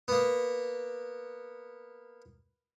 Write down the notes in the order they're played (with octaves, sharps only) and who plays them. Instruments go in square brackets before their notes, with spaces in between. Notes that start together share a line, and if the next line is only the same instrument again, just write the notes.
[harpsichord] A#3 B3